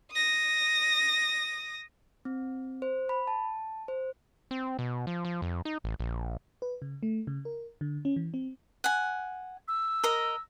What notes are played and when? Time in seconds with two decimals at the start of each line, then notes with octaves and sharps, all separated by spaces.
0.12 D#6 A#6
2.25 C4
2.82 C5
3.09 B5
3.27 A5
3.88 C5
4.51 C4
4.79 B2
5.07 F3
5.25 F3
5.42 F2
5.65 D#4
5.84 A1
6.00 A#1
6.62 B4
6.82 C#3
7.03 A3
7.27 C#3
7.45 A#4
7.81 D3
8.05 C#4
8.16 E3
8.34 C4
8.84 F#5 G#5
9.68 E6
10.04 A#4 D#5